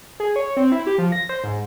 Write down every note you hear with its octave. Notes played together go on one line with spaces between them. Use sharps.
G#4
C#5
C4
E4
G4
F3
A#6
C5
G#2